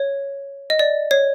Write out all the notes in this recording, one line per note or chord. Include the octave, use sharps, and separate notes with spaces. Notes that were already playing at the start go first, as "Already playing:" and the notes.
Already playing: C#5
D#5
D5
C#5